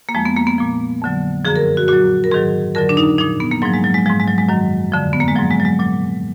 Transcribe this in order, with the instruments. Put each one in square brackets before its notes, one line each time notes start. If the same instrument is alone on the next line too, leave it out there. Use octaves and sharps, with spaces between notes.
[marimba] A#3
F2 F3 G#3
B3
A#3
B3
A#2 F3
F2 D3 F#3
F#2 D3 F3 G#4
A#4
F#4
A#2 F#3 F#4
A#4
G#2 D#3 F#3 G#4
F2 D3 F#3 A#4
D4
D#4
A#2 F3 D#4
B3
A#3
G#2 F3 F#3
G#3
F#3
G#3
F3 G#3
G#2
G#3
F#3
G#3
F#2 D#3 F#3
F2 D3 F3
B3
A#3
G#3
G#2 F3 F#3
G#3
F#3
G#3
A#2 F#3